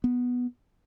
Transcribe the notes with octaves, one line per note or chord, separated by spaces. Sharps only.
B3